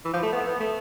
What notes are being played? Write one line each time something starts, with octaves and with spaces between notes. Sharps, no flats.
E3
F3
A3
B3
B3
A3